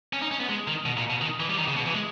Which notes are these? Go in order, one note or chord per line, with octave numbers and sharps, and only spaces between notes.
C#4
D#4
C#4
B3
G#3
D#3
B2
A#2
B2
D#3
E3
G3
D#3
C#3
B2
E3
G#3